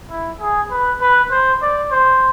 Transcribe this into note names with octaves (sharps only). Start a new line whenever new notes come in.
E4
G#4
B4
B4
C5
D5
C5